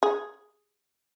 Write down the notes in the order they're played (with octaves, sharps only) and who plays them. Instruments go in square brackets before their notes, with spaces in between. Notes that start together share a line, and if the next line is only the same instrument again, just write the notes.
[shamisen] G#4